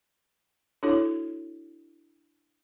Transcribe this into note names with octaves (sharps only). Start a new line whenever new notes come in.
D4 E4 F#4 A4 C#5